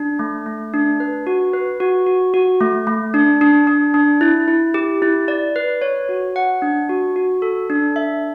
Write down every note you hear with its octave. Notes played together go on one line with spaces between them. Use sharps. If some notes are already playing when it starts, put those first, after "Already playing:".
Already playing: D4
A3
A3
D4
B4
F#4
B4
F#4
F#4
F#4
A3
A3
D4
D4
D4
D4
E4
E4
G4
E4
D5
B4
C#5
F#4
F#5
D4
F#4
F#4
A4
D4
E5